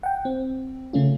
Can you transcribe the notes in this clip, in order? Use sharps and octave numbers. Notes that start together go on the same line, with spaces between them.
F#5 G5
C4
C#3 A3 C#4 F4